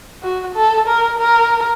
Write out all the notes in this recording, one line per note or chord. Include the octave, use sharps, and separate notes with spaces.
F#4
A4
A#4
A#4